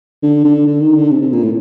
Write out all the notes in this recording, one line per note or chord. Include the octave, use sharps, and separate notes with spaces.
D3
D3
D3
D#3
D3
C3
C3
A#2
A2